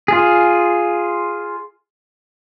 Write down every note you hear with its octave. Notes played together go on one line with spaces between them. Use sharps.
F4 G#4